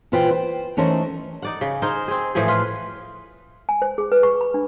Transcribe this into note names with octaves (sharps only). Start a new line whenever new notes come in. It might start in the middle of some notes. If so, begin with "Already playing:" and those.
A#2 E3 F4 B4 C5 G5
C5
E3 A3 C#4 D#4 A#4 C5
D#4 D5 F#5
C#3
D#4 G#4 A#4 C5
C4 G#4
A2 E3 F3 G#4
F4 B4
G#5
C5
G#4
B4
C#6
B5
D4